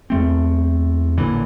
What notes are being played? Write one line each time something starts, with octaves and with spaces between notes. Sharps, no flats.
E2 A3 C4
A1 A#2 D3 E3